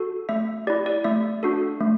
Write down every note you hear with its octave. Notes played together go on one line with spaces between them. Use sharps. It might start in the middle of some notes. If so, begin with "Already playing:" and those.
Already playing: F#4 A4
A3 E5
E4 G4 D5
D5
A3 E5
D4 F#4 A4
A3